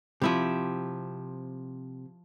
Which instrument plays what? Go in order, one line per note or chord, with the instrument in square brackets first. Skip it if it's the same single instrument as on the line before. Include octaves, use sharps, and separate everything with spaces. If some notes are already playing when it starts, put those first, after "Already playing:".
[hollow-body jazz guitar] C3 [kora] F3 E4 G4